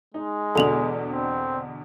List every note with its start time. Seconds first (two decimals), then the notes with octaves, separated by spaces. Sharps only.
0.14 G#3 D#4
0.55 E2 B2 D3 A4 F7 F#7
1.09 C4